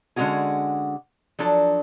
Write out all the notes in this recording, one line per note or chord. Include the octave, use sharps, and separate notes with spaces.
D3 G#3 C#4 D#4 F#4 G#4
F3 F#3 D4 A4